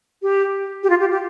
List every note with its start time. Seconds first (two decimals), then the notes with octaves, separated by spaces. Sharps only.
0.22 G4
0.83 G4
0.90 F4
1.00 G4
1.11 G4